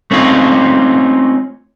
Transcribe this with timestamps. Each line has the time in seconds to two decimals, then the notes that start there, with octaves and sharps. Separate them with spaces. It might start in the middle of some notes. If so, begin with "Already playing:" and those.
0.11 A3 C4 C#4 D#4 F4